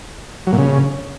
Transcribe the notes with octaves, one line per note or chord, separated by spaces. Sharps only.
F#3
A#2
C#3